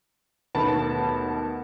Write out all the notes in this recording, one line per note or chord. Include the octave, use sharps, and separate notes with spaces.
D#2 B2 A3 A5 B5